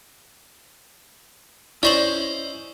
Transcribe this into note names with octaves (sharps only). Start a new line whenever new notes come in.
C#4 E4 C5 D5 D#5 C#6 F#7